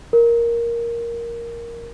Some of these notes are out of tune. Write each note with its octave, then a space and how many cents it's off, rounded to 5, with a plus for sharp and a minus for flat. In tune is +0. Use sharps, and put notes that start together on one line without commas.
A#4 +5